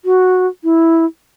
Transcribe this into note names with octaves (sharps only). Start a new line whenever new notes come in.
F#4
E4